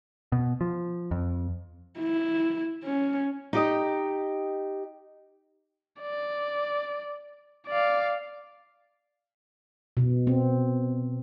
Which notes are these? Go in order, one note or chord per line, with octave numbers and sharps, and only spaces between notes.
B2
F3
F2
E4
C#4
D#4 G4 D#5
D5
D5 F5
B2
C4